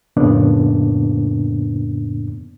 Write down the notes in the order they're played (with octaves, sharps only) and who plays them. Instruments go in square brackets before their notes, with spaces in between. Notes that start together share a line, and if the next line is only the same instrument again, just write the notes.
[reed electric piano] F2 A2 C#3 A#3 B3 D4